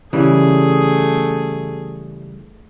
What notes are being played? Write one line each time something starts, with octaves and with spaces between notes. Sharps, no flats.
C#3 E3 G3 A3 G#4